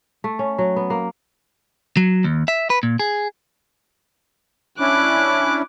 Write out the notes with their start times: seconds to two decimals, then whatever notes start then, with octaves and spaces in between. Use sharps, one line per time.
0.24 A3
0.39 C#4
0.58 F#3
0.76 B3
0.90 A#3
1.97 F#3
2.24 D#2
2.48 E5
2.70 B4
2.83 A#2
2.99 G#4
4.80 C#4 D4 E4 D6 F#6